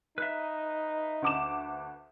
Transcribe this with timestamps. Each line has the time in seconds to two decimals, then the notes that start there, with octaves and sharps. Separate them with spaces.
0.18 D#4 B4 E5
1.22 D2 D6 E7